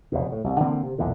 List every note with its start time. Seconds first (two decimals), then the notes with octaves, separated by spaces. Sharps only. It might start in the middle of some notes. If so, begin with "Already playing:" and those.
0.12 F1 E2 B2
0.32 A2
0.44 C2
0.60 D3 E3 A#3 C4
0.83 C3
0.98 B1 E2 A#2 D3